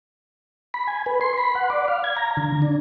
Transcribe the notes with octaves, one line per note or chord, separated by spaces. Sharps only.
B5
G#5
B4
C6
B5
F#5
D5
F5
G#6
A#5
D3
D4